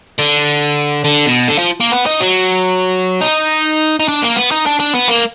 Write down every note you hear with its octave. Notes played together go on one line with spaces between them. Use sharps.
D3
D3
B2
D3
F3
A#3
B3
D#4
F#3
D#4
D#4
D4
A#3
B3
D#4
D4
D4
B3
A#3